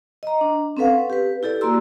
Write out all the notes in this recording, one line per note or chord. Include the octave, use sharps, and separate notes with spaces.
D#5 A#5
D4
C4 C#4 A4 B4 F5 F#5
G4 B4
E4 G4 A4 D5
A#3 F#4 A#5 C6 E6